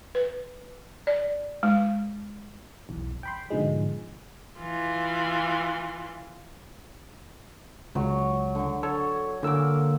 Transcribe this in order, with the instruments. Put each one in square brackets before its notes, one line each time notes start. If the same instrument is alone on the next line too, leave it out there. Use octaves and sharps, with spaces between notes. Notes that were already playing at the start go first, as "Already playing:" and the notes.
[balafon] B4
D5
G#3
[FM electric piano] B1 E2
G5 B5 C6
G#2 B2 D3 F3 G#3
[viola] E3 F4
[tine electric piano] C#2 [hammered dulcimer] F#3 C#6
[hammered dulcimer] D3
[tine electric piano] A4 [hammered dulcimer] C#5
[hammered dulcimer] A#2 A#4 D6 [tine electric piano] D3 E6